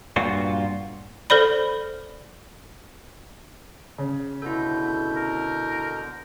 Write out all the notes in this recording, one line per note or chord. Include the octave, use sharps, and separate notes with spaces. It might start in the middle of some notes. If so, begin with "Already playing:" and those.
G2 A#2 F4 F#4
A4 C5 D5 B5
C#3
B2 D3 E4 A4 G6
A#4